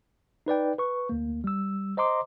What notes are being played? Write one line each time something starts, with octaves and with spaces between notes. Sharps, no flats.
D#4 B4 D5 G5
B4 C#6
D2 A#3
G3 E6
C5 D#5 A#5 C6 D6